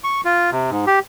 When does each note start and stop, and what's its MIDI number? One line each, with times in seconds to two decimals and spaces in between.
0.04 0.21 85
0.25 0.51 65
0.52 0.70 48
0.70 0.85 44
0.87 0.99 67